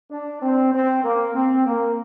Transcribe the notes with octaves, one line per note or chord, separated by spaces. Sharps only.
D4
C4
C4
A#3
C4
A#3